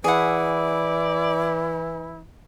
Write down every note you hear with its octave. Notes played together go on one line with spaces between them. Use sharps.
E3 E4 G#4 D5 F#5